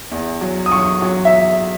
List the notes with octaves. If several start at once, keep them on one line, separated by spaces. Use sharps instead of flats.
E2
F#3
D#6
F#3 C#6
F#3
E5